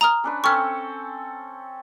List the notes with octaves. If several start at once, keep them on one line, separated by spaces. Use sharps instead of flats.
A#5 D#6 F6
C#4 D4 B4
C4 C#4 A4 C#6 F6